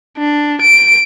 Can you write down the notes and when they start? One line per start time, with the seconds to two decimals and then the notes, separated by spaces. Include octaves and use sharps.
0.18 D4
0.61 D7